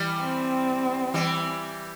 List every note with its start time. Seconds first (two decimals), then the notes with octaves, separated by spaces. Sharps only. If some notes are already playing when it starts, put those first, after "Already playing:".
Already playing: E3 G3
0.21 C4
1.14 E3 G3